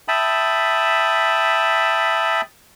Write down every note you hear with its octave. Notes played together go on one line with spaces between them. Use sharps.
E5 G5 A5 B5 D#6